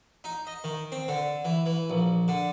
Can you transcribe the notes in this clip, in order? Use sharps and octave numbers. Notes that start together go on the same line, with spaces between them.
D#4
D#5
D#3
C4
D3
E3
E3
A#1
D3